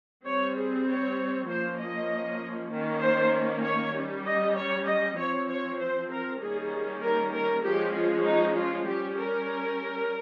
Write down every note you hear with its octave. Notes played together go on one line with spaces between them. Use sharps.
G3 C4 C#5
G#4
C#5
F3 A#3 C#4 C5
D#5
D#3 A#3 C#4
C5
C#5
G3 C#4
D#5
C#5
D#5
F3 C4 C#5
C#5
C5
A#4
D#3 G3 A#3 C#4 G#4
A#4
A#4
F3 G#3 C#4 G4
F4
D#4
F4
G3 C#4 G4
A#4